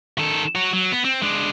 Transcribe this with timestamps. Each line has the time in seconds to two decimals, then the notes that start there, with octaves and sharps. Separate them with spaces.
0.18 D#3 A4
0.55 F#4 C#5
0.73 F#3
0.92 B3
1.05 C4
1.22 G#3 D4